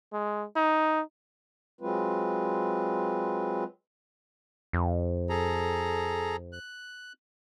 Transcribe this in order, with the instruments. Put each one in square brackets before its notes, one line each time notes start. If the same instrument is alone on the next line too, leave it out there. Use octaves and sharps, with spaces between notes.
[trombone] G#3
D#4
[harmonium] F#3 G#3 C4 F4 B4
[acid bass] F2
[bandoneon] G#4 A4 A#5
F#6